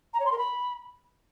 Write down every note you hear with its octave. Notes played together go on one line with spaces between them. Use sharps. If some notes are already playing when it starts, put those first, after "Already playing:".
A#5
C#5
C6
A#4
B5